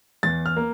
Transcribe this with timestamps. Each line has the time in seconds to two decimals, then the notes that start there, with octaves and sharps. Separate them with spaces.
0.23 E2 A6
0.46 F6
0.56 A#3